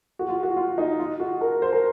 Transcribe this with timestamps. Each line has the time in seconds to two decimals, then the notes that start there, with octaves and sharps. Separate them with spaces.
0.19 F#4
0.29 F4
0.43 F#4
0.57 F4
0.78 D#4
0.99 F4
1.20 F#4
1.41 A#4
1.62 C5
1.73 A#4